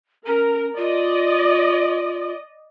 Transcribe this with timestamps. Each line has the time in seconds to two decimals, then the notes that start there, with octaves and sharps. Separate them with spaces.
0.27 C#4 A#4
0.77 F4 D5 D#5